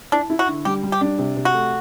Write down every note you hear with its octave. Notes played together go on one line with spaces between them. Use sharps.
D4 E4
E4
F#4
D3
G3 G4
G3
G4
D4
C3
C3
F#4
A3